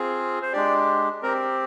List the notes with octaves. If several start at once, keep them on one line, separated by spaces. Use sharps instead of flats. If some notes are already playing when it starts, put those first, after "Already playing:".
Already playing: C4 F4 G#4
C5
G#3 D4 G4 D5
C4 G4 A#4